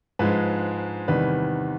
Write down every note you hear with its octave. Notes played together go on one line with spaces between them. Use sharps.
G#2 F3 G#3 B4
E2 C3 D#3 G3 B4